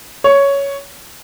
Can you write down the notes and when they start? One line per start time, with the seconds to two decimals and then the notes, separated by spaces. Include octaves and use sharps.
0.24 C#5